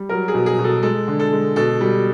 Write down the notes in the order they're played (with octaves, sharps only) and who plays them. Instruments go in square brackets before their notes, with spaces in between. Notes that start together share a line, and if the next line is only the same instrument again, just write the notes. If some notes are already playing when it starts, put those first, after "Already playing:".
Already playing: [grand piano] G3
F#3 A#4
G#4
B2
G#4
B2
A4
G#3 A4
D3
A4
G#3
B2 A4
G3